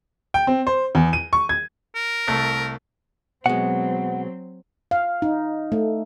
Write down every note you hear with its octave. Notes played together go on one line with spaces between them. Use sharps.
G5
C4
C5
E2
D#7
C#6
G#6
A#4
C2 A3
B2 F#3 G#3 C4 F#5
F5
D#4
A3